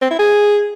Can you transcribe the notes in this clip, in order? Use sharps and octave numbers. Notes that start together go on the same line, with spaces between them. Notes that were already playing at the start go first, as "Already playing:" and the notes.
C4
E4
G#4